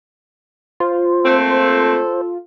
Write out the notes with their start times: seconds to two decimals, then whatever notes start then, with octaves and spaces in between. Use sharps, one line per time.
0.80 F4 C5
1.25 A3 A#3 C4 A4